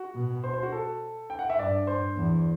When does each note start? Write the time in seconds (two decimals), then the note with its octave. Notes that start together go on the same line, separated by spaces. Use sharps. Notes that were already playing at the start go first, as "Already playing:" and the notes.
Already playing: F#4
0.15 B2
0.44 C5
0.54 C5
0.63 F#4
0.72 A4
1.30 G5
1.39 F#5
1.50 E5
1.59 G2 D5
1.87 C5
2.17 E2